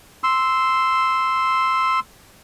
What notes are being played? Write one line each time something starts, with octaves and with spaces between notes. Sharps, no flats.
C6 E6